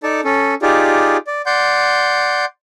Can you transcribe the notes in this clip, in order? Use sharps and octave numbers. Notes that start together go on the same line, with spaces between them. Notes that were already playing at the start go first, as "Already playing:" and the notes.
D#4 A4 D5 A5
C#4 A4
D#4 F4 G4 G#4 D5
D5
D5 F#5 C6 G6